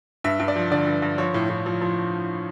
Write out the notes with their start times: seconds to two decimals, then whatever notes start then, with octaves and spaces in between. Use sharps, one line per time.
0.24 G2 E5
0.40 G2
0.48 D5
0.56 F3
0.71 D3 D5
0.87 G2
1.02 G2
1.18 F3 C#5
1.34 A2
1.50 A2
1.66 F3
1.81 F3